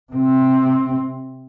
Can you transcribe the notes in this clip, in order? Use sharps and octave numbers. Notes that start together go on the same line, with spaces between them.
C3 C4